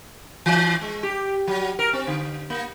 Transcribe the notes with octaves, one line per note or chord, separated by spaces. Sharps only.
E3
G#3
G4
F#3
A#4
C4
D3
A#3